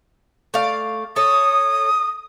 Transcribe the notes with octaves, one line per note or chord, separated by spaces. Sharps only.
A3 D5 F5
A4 C#5 D#6